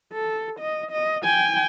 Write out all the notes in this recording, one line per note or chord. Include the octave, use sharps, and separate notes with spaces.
A4
D#5
D#5
G5 G#5